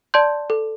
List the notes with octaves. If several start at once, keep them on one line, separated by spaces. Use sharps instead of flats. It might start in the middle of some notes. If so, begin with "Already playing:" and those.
D5 A5 C6 G6
A4